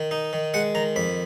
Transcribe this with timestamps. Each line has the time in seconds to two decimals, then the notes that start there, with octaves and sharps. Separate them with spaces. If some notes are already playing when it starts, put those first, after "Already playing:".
Already playing: D#3
0.11 D#4
0.33 D#3
0.54 G#3 F#5
0.75 D#3 A#5
0.96 F2 B5